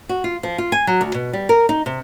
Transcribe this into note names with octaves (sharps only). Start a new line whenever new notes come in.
F#4
F4
F3
F4
G#5
F#3
D2
B2
G3
A#4
D#4
C3